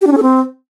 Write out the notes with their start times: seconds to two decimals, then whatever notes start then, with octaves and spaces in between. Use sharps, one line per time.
0.02 G4
0.07 D4
0.12 C#4
0.17 A4
0.23 C4